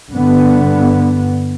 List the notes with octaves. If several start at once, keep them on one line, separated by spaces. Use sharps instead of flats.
G2 D3 B3